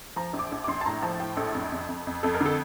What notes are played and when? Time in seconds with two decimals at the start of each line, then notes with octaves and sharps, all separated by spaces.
0.16 F3 A#5
0.33 A#1
0.39 D6
0.52 A#1
0.64 D6
0.68 A#1 C6
0.81 A5
0.86 A2 A#5
1.03 F3 A5
1.20 A2 G5
1.37 A#1 A4
1.55 F2
1.72 F2
1.89 F2
2.07 F2
2.23 F2 A4
2.35 A#4
2.41 D3
2.46 A4